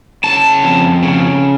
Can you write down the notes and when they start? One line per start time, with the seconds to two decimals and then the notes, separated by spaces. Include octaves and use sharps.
0.24 C#3 A5
0.64 F2
1.03 C#3